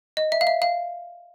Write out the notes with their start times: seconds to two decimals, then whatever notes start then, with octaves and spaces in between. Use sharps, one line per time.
0.17 D#5
0.32 E5
0.41 F5
0.47 E5
0.62 F5